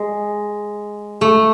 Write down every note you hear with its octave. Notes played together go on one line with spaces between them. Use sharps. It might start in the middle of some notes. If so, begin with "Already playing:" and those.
Already playing: G#3
A3